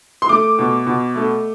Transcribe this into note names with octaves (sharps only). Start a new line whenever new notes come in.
C6
A3 D6
B2
B2
A3